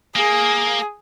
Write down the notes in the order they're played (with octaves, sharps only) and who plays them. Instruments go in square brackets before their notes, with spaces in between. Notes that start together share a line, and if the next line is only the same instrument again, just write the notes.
[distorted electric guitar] A#3 [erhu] G#4